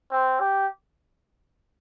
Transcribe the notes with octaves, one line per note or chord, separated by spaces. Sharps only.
C4
G4